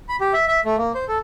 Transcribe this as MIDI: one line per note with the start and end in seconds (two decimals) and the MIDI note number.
0.09 0.16 83
0.21 0.33 67
0.33 0.45 76
0.48 0.60 76
0.65 0.76 57
0.78 0.92 58
0.95 1.05 72
1.08 1.18 69